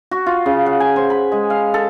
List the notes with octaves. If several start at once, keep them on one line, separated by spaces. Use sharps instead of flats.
F#4
F4
C#3
F#5
G#5
C5
B5
G#3
F5
A4